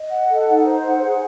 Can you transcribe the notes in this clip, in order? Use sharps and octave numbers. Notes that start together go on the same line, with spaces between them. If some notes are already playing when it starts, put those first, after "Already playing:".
Already playing: D#5
F#5
A4
D#4
C5
F#5
G#4